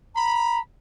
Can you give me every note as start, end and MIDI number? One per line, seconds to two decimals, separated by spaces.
0.15 0.58 82
0.15 0.59 83